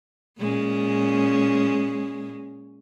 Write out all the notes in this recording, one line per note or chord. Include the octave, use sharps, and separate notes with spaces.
A#2 G#3 C#4